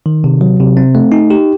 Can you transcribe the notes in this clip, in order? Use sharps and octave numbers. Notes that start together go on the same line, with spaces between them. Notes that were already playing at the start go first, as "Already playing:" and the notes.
D#3
C3
F#3
C3
C4
A3
D#4
G4